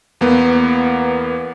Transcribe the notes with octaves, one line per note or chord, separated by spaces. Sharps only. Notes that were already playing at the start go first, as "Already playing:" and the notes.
E2 A#3 B3